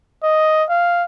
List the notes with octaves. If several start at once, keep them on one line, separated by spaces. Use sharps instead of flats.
D#5
F5